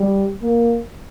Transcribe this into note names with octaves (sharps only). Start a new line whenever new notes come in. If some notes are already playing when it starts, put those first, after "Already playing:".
Already playing: G3
A#3